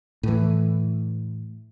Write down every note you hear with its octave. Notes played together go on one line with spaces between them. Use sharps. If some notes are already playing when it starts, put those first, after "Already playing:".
A2 E3